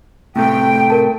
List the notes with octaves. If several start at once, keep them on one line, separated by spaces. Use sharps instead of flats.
A2 C3 A3 G5
A#4 A5